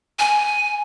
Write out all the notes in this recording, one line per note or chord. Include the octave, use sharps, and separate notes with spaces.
G#5